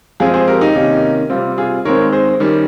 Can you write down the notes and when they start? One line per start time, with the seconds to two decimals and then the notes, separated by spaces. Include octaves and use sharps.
0.20 F3 G#3 C4 F4 G#4
0.34 G#4 C5
0.47 G4 A#4
0.61 D#4 G4
0.75 C3 D#3 A#3 C#4
1.30 C3 G3 C4 F4
1.58 F4 G#4
1.85 D#3 G#3 C4 A#4 C#5
2.12 G#4 C5
2.40 D#3 G3 C#4